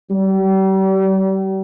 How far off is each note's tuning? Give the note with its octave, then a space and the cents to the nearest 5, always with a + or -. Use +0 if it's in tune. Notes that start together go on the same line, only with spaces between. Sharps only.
G3 -40